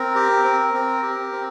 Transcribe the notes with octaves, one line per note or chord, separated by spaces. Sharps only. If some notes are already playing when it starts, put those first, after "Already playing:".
Already playing: C4 A#4
G4
C4
C4
G4
C4